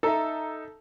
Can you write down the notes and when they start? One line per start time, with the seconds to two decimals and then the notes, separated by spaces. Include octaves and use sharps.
0.03 D#4 A4 E5 A#5